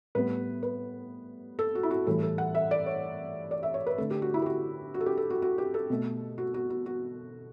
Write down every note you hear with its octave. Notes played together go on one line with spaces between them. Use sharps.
A2 G3 B3 B4
B4
A4
F#4
E4
F#4
A2 E3 G3 A4
A4
F#5
E5
D5
C#5
D5
E5
C#5
B4
D3 A3 A4
G4
F#4
E4
G4
F#4
F#4
A4
G4
A4
F#4
F#4
G4
A4
B2 A3
F#4
F#4
F#4
F#4